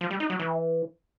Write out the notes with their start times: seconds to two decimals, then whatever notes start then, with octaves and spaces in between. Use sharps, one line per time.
0.01 F3
0.10 G3
0.20 D#4
0.30 F#3
0.39 E3